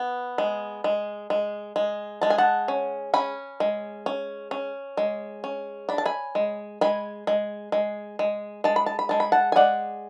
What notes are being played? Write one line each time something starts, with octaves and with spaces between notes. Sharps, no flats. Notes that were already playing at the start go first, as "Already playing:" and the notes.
Already playing: B3
G#3
G#3
G#3
G#3
G#3 A5
G#5
F#5 A5
C#4
C#4 G#5 B5
G#3
C#4
C#4
G#3
C#4
D4 B5
A5
G#5 B5
G#3
G#3 G#5 B5
G#3
G#3
G#3
G#3 A5
B5
A5
B5
G#3 A5
B5
F#5 A5
G#5
G#3 D5 F#5